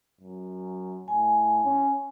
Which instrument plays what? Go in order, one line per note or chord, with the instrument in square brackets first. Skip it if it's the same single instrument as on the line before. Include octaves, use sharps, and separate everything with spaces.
[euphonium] F#2
[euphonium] A2 [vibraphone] G#5
[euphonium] C#4